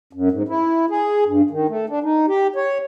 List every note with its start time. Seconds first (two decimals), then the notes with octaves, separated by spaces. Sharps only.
0.13 F#2
0.31 G#2
0.48 E4
0.90 G#4
1.26 G2
1.50 D#3
1.69 A3
1.89 D4
2.04 D#4
2.28 G4
2.56 C#5